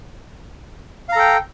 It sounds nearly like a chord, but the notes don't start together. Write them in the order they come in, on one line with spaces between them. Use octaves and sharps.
F5 A#5 A4 G5